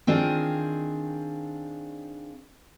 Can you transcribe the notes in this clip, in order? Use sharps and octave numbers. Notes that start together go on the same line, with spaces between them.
D#3 C4 D4 F4 G#4